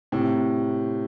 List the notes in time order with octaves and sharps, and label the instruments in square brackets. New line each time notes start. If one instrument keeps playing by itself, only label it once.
[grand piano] A2 C3